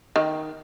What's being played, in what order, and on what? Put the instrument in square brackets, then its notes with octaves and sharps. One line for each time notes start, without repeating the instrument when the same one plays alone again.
[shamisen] D#3